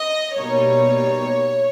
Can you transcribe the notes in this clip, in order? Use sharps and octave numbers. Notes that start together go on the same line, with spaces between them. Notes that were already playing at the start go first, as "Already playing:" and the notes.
Already playing: D#5
B2 G3 A#3 D#4 C#5